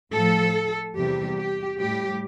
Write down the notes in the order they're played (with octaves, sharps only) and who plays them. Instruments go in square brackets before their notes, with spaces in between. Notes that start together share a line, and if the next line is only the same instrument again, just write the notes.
[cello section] A2 F3 A4
E2 C3 G3 G4
G4
A2 G3 G4